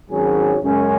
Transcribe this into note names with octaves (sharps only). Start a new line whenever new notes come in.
G#1 G#2 F#3 C#4 G#4
F#2 C#3 G#3 C#4